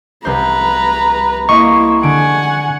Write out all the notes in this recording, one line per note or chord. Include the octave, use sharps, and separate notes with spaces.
C2 B4 C5 A#5
A#3 E4 D#5 C6 C#6 D#6
D3 F#5 G#5 D7